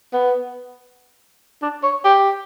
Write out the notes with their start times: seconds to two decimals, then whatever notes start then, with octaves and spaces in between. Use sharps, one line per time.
0.13 B3
1.62 D4
1.83 C#5
2.05 G4